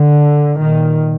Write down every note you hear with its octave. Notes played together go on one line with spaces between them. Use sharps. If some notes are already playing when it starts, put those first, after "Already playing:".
Already playing: D3
A#2 D#3